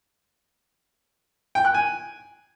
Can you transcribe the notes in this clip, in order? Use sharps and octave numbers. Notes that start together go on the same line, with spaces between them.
G5
F#6
G#5